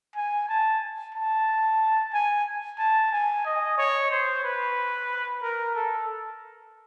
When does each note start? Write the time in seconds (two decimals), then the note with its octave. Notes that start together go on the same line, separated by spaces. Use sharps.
0.15 G#5
0.49 A5
1.15 A5
2.14 G#5
2.79 A5
3.11 G#5
3.45 D#5
3.78 C#5
4.11 C5
4.44 B4
5.42 A#4
5.75 A4